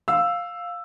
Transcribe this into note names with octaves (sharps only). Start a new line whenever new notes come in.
F5 E6